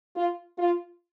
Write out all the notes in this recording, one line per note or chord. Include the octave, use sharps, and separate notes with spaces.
F4
F4